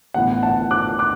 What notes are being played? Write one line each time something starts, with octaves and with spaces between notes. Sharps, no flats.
A1 A2 E3 B3 F#5
F#5 A5
D6 F#6
D6 F#6